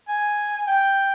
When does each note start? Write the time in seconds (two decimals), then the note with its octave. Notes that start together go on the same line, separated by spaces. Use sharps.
0.08 G#5
0.67 G5